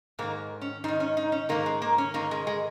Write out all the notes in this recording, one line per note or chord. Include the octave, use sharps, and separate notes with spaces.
G#2 D#3 A#3
C#4
G#2 D#3 D#4
C#4
D#4
C#4
G#2 D#3 A#3
G#3
A#3
C#4
G#2 D#3 A#3
G#3
G#3